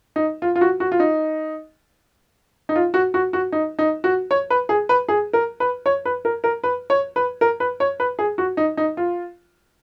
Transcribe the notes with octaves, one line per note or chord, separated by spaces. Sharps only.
D#4
F4
F4
F#4
F#4
F4
D#4
D#4
F4
F#4
F#4
F#4
D#4
D#4
F#4
C#5
B4
G#4
B4
G#4
A#4
B4
C#5
B4
A#4
A#4
B4
C#5
B4
A#4
B4
C#5
B4
G#4
F#4
D#4
D#4
F4